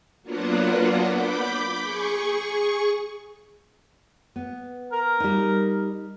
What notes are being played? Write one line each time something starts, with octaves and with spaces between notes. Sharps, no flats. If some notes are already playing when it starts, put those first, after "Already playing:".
F#3 A#3 B3 D4 F4 F#5
B5 D6 G6
G#4 C#6
B3
A#4
G3 D#4